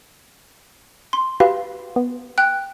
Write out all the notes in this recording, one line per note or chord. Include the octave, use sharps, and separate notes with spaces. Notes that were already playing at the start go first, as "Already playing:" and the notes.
C6
F#4 G4 B4 F5
B3
G5 F#6